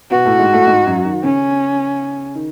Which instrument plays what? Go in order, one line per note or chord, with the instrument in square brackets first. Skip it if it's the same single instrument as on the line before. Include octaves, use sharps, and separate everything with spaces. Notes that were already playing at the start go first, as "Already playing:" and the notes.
[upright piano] B2 B3 [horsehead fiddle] F#4
[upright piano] A2 A3
G#2 G#3
A2 A3
G#2 G#3
F#2 F#3
D#3
[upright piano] C#3 [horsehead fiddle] C#4
[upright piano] D#3